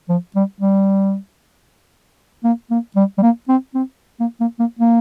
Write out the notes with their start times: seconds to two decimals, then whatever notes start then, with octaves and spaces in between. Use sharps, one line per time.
0.09 F3
0.35 G3
0.61 G3
2.44 A#3
2.71 A#3
2.96 G3
3.18 G3
3.22 A#3
3.49 C4
3.75 C4
4.20 A#3
4.40 A#3
4.59 A#3
4.79 A#3